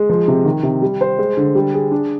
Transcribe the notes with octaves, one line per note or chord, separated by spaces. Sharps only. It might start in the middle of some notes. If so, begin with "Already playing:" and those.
Already playing: G#3
F3
C3
D#3
C3
G3
C5
G#3
D3
G3
G#4
D4